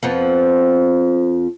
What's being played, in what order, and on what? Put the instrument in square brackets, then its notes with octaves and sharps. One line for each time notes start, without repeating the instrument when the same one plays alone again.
[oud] F2 F3 B3